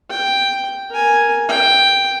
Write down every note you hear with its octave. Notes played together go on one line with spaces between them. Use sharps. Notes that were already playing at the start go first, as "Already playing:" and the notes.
G5
A#4 G#5
G5